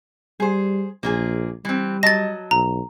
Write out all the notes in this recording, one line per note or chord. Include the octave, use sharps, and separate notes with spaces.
G3 G#4 C5
A#1 A#3 F4 G#4
E3 G3 C4
F#3 D#5 A5 A6 A#6
B1 A#5